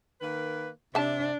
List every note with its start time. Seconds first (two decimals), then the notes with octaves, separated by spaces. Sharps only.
0.21 D#3 A#3 B4
0.95 C3 D4 E5 A5